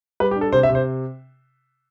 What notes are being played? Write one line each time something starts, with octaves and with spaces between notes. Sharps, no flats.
G3 B4
G4
D4
A4
C3 C5
E5
C3
C5